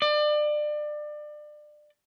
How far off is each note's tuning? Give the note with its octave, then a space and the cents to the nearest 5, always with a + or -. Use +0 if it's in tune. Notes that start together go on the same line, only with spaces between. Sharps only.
D5 +30